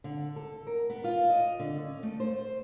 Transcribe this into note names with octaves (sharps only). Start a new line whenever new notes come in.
D3
A4
A#4
B3
F4
D#5
D3
C#4
A3
C5